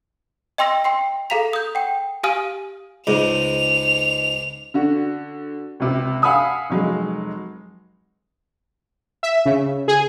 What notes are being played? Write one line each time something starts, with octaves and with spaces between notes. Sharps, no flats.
D#5 G5 C6 E6 A#6
G5 C6 C7
G#4 A4 F5 A#5 B6 F7
D#6 G6
F#5 G5
G4 F5 G#5 D#6 F6 D#7
C#2 G#2 F7
D3 F#4
C#2 C3
F5 F#5 G#5 B5 D#6 E6
F1 F#3 G#3
E5
C#3
G#4